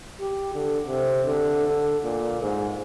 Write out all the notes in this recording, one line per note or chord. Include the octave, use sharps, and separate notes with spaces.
G4
D3
C3
D3
D3
A#2
G#2